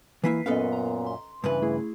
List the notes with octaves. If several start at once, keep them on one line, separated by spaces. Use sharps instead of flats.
E3 A#3 E4 B4 B6 C7
F#2 A#2 B3 C#4 A4 B4 D#5 F5
A#5
C6
G2 C#3 E3 B4
A3 E4 G#4